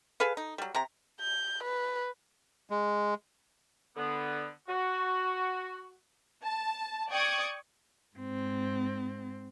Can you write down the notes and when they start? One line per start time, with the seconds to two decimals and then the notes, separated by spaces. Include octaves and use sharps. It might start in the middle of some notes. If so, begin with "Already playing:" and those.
0.20 G#4 A4 B4 F5
0.37 D#4
0.58 F#3 G3
0.75 C3 A#5
1.21 G6
1.64 B4
2.70 G#3
3.96 D3 B3
4.69 F#4
6.44 A5
7.10 D5 G5 C#6 D#6 G#6 D7
8.17 G#2 C4